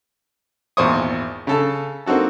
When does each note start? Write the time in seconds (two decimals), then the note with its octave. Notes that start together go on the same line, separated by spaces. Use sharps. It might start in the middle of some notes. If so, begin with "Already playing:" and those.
0.77 G#1 E2 A#2 C5 C#6 D#6
1.47 C#3 A4 A5
2.06 A#3 C4 D#4 F#4 A4